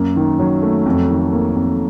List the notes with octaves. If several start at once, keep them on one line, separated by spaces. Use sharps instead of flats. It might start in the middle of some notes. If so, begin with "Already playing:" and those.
Already playing: F#2 A#3
D#3
F#3
A3
F2
D#3
A#3
F2